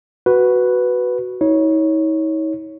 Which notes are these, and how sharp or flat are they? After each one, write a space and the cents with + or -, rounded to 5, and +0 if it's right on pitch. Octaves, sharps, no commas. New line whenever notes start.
F#4 +0 B4 +0
D#4 +45 C#5 +0